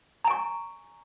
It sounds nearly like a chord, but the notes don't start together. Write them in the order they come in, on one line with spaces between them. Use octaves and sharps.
A#5 G#5 C#6